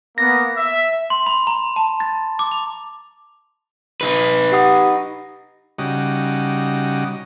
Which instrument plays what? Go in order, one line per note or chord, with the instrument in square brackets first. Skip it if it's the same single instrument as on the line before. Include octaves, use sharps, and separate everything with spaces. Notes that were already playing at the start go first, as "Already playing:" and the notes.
[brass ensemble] A#3 B3 [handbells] A#6
[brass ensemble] E5
[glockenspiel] C6
B5
A#5
A5
A6
D6
F7
[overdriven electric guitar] D#4 B4
[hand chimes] G4 F#5 D#6
[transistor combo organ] C#3 G3 D#4 F#4 D#5 D6